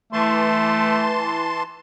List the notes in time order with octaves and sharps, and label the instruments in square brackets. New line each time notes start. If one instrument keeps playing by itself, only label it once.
[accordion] E3 A5 C6 [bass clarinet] A3